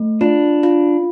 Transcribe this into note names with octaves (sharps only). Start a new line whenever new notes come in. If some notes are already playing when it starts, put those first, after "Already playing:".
Already playing: A3
D4 F4
F4